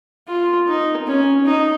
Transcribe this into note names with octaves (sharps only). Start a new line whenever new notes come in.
F4
D#4
C#4
D#4